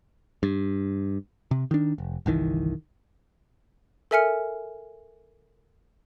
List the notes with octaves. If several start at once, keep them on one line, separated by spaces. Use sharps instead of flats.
G2
C3
D#3 D4
F1
G1 C2 D#3 E3
A4 A#4 E5 G#5 F6 C#7